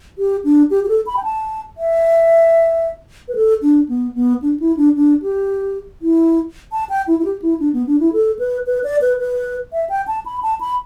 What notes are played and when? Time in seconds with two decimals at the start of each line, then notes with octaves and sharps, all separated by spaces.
0.18 G4
0.44 D4
0.71 G4
0.84 G4
0.88 A4
1.07 B5
1.17 G5
1.23 A5
1.78 E5
3.28 B4
3.35 A4
3.62 D4
3.89 B3
4.15 B3
4.42 D4
4.60 E4
4.77 D4
4.96 D4
5.22 G4
6.02 E4
6.72 A5
6.89 G5
7.07 E4
7.19 E4
7.25 G4
7.42 E4
7.60 D4
7.73 B3
7.87 D4
8.00 E4
8.13 A4
8.39 B4
8.66 B4
8.84 D5
9.01 B4
9.19 B4
9.73 E5
9.89 G5
10.07 A5
10.26 B5
10.43 A5
10.61 B5